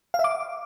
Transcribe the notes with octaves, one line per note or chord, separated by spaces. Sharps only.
F5
E5
D6